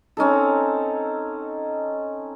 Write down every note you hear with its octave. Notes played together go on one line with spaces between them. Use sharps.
C4 C#4 D#4 A4